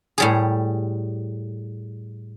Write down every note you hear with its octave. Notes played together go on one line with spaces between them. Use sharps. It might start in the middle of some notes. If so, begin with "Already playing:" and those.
A2 G3 G#4